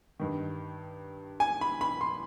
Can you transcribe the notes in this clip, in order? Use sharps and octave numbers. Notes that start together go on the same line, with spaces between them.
G2 D#3
G#5
B5
B5
C6